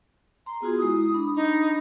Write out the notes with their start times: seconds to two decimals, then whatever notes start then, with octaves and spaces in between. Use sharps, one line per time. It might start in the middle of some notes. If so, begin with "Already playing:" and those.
0.46 A#5 C6
0.62 B3 F4 F#4 G#4
0.78 G#3 E4 D#6
1.14 D4 B5
1.36 D#4